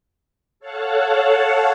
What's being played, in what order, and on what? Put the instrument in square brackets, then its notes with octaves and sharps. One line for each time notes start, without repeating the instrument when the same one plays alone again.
[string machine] A4 C#5 F5 F#5 A5